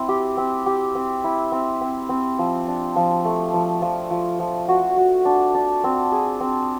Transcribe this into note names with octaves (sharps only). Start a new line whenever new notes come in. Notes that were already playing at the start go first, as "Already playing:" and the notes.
Already playing: C4 E4
G4
C4
G4
C4
E4
C4
C4
C4
F3
D4
F3
A3
F3
F3
F3
F3
F#4
F#4
D4
D4
C4
G#4
C4